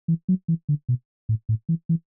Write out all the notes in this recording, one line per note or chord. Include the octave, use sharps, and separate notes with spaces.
E3
F#3
E3
D3
B2
A2
A2
E3
E3